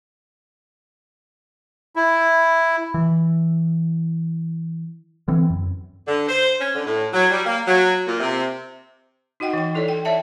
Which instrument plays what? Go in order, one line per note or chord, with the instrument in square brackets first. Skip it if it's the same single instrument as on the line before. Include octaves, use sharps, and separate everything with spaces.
[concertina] E4
[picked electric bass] E3
D3 E3 C4
F#2
[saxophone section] D3
C5
C#4
D3
A2
F#3
G3
A#3
F#3
A#2
C3
[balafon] D#4 F#4 D#5 F#5 G5
E3 G5
E4 A4 C#5 D5
G5
C#5 D5 E5 G5 A5